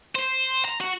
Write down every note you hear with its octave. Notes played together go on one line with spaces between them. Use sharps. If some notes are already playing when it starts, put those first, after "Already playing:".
C5
A#5
F#4